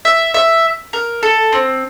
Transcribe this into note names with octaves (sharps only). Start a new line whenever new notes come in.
E5
E5
A#4
A4
C4